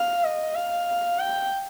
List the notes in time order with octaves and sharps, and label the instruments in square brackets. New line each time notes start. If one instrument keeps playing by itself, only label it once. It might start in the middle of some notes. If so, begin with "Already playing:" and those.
Already playing: [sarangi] F5
D#5
F5
G5